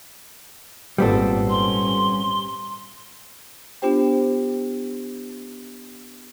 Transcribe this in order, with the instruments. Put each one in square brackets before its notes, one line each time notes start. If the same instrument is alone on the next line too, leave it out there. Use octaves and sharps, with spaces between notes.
[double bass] G#1 [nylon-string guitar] A#2 A4 [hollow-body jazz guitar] G3 B3 C4
[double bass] C#4 [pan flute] C6
[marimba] B3 D4 F4 G4 C5 G5